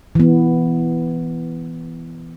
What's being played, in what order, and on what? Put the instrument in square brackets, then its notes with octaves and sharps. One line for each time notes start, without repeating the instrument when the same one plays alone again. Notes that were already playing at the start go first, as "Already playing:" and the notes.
[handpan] E3 B3